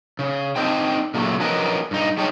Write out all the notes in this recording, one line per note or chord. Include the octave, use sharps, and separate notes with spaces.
C#3
C4 D4 D#4 C5 G5
A#2 C#3 F#3 A3
F3 F#3 C#4 A#4 B4 D#5
G2 D#4
G3 G#3 D4 D#4 G4 C#5